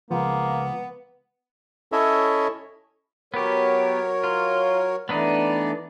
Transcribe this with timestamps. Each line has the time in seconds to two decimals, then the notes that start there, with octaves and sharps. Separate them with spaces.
0.11 C#2 F3 A#3 B3
1.92 C#4 E4 A4 C#5 D#5 E5
3.34 F#3 B3 G4 A#4 C#5
4.24 F4
5.09 E3 A3 B3 D4 D#4 D5